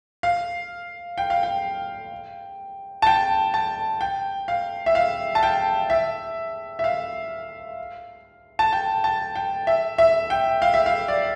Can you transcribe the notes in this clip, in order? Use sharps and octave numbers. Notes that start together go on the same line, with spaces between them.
F5
G5
F5
G5
A5
G5
A5
G5
F5
E5
F5
A5
G5
E5
E5
F5
A5
G5
A5
G5
E5
E5
G5
F5
E5
F5
D5